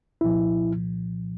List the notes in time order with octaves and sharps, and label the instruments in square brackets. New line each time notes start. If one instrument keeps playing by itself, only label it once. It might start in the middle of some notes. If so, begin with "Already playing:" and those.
[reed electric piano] C2 A#2 F3 E4